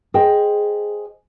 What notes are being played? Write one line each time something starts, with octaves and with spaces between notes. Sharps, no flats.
G#4 C5 D#5 G5